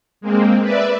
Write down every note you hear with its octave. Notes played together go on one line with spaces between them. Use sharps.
G#3 A#3 C4
B4 D5 E5